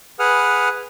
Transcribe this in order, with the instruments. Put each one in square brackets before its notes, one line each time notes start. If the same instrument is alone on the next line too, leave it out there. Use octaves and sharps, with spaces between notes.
[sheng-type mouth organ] G#4 B4 F#5 D#6 F6